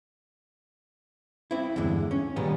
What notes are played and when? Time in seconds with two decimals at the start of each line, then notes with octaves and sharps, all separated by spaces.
1.51 C4 E4
1.76 E2 G2 D3 G#3
2.11 C#4
2.36 A#2 D#3 G3 G#3 B3